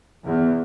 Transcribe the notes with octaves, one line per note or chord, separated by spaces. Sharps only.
E2